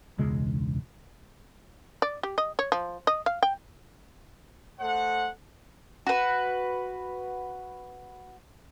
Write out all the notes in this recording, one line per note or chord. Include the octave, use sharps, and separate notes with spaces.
E1 C#2 G#3
D5
G4
D#5
C#5
F3
D#5
F5
G5
A3 A4 C5 D#5 F#5
F#4 B4